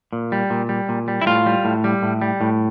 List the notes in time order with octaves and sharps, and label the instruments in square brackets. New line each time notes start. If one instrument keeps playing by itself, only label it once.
[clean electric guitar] A#2
G3
A#2
G3
A#2
G3
E4
A2 F4
G3
A2
G3
A2
G3
A2